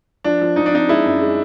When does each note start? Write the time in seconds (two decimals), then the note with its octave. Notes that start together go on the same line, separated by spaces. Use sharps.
0.24 F3 D4
0.41 F3
0.56 F3 D#4
0.66 D4
0.72 C4 D#4
0.88 G#3 E4
1.05 F#2
1.21 G#3